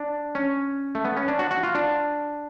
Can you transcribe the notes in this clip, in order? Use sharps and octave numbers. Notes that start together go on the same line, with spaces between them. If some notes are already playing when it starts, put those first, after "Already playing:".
Already playing: D4
C#4
A3
B3
C#4
D4
F#4
F#4
F4
D4